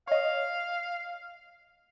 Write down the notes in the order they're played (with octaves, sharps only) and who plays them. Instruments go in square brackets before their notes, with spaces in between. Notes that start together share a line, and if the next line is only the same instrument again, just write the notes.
[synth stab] C#5 D#5 [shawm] F5